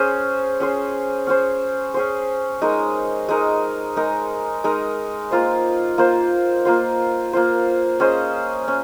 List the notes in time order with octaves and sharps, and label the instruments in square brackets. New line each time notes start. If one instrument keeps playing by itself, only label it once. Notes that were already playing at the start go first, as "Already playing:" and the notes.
Already playing: [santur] C#4 G#4 C5
C#4 G#4 C5
C#4 G#4 C5
C#4 G#4 C5
G#3 D#4 A#4
G#3 D#4 A#4
G#3 D#4 A#4
G#3 D#4 A#4
A#3 F4 C5
A#3 F4 C5
A#3 F4 C5
A#3 F4 C5
C#4 G#4 C5 D#5
C#4